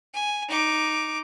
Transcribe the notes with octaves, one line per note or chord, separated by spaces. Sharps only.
G#5
D#4 D6